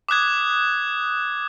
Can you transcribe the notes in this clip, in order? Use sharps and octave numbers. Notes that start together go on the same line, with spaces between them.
D6 D#6 F#6 G#6